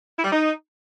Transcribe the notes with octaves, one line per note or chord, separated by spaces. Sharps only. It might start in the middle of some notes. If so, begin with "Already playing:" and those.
E4
G3
D#4